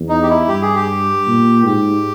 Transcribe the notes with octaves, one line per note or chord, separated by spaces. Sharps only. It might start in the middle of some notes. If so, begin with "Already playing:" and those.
Already playing: E2
D#4
G4
E4
G2 G4
G#4
G4
A#2
G#2 G4